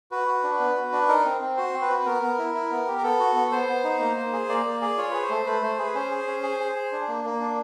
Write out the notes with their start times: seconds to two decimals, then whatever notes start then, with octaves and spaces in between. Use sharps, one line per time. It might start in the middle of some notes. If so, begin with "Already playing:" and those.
0.11 F#4 B4
0.28 F#4
0.44 D4
0.60 B3
0.76 F#4
0.92 D4
1.09 D#4 A#4
1.25 C4
1.41 C4
1.57 F#4 C5
1.73 C4
1.82 B4
1.90 F#4
1.99 B4
2.06 B3 A#4
2.22 B3
2.38 E4
2.55 E4
2.71 B3
2.87 G4
2.98 A#4
3.03 B3 A4
3.20 F#4
3.35 B3
3.51 B3 C5
3.68 B3
3.84 D#4
4.00 A#3
4.17 A#3
4.33 G#4
4.49 A#3 D5
4.65 A#3
4.81 G#4
4.98 F4 C#5
5.11 G#4 B4
5.22 C5
5.30 A3
5.46 A3 B4
5.62 A3 C5
5.78 G#4 B4
5.95 C#4 C5
6.11 G#4
6.27 C#4
6.43 G#4
6.60 G#4
6.75 G#4
6.92 D4
7.08 A#3
7.25 A#3
7.40 D4